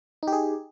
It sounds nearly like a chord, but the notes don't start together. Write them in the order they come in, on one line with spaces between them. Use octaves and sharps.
D#4 G4 G#4